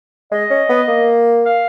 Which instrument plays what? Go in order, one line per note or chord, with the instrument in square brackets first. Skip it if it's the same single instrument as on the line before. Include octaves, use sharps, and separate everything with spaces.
[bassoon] G#3 [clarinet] D#5
[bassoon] C#4
B3
A#3
[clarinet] F5